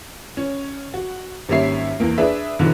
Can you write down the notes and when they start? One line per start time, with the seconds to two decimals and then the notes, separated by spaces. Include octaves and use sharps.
0.37 C#4
0.94 F#4
1.49 G#1 G3 A#3 C#4 E5 C7
2.00 E2 A#3
2.18 D4 G#4 B4 E5
2.59 B1 D3 E3 F#3 B3